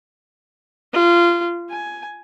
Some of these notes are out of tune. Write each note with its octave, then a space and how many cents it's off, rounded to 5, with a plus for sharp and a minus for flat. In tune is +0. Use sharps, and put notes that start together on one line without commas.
F4 -20
G#5 +10